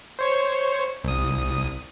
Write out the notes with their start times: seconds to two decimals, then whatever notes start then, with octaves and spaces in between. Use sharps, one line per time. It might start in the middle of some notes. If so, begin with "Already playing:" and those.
0.19 C5 C#5 C#6
1.04 C2 D#6